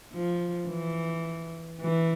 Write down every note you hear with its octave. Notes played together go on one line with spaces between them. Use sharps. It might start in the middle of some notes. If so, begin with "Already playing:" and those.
F3
E3
E3